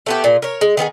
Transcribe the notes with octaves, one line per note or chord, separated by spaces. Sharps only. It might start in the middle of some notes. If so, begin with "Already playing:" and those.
A3 B3 G4
A#2 G#4
A#4 C#5
G#3
D#3 B3 G4 G#4